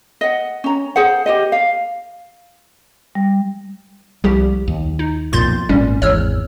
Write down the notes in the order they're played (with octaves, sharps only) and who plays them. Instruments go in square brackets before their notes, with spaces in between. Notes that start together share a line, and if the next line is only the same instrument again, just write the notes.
[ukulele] D#5 F#5
C#4 A#5
G#4 C5 F#5
G4 C5 D#5
F5
[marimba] G3
[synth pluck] C2 F3 G4 [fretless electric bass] G3
[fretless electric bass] D#2
[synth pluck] D#4
[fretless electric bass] B1 F2 A#2 [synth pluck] C6 G6 A6
[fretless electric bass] G#1 A#2 [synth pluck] G3 C#4
[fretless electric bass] G#1 E2 [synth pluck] C#5 E6 F6